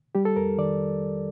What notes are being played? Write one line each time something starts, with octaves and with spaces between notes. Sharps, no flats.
G3 G4
A4
F2 A#4
D#3 D5